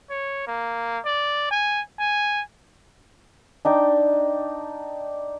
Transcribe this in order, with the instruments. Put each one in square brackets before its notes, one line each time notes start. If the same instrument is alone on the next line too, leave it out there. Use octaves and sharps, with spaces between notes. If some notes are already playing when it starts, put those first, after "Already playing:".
[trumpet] C#5
A#3
D5
G#5
G#5
[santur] D4 D#4 G5